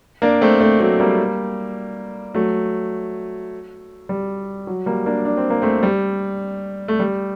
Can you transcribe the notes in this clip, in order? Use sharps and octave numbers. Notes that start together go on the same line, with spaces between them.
A#3 D4
A3 C4
A3 C4
F#3 A3
G3 A#3
F#3 A3
G3
F#3
G3 A#3
A#3 D4
D4
C4
A#3
A3 C4
G3
A3
G3